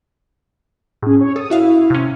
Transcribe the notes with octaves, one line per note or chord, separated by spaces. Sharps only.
A2 C#4 G#4
C#5
A4 D#6
E4 F#4 E5 F5
C3 C#4